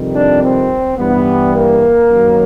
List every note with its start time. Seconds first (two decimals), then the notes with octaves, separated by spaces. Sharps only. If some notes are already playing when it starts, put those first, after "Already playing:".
Already playing: F2 C3 D#3 G3
0.14 D4
0.43 C4
0.98 G2 E3 G3 B3
1.55 A#3
2.10 F#2 D#3 F#3